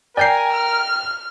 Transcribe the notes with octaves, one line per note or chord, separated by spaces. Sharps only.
A#4 D5 G5 G#5 G6 C7
F6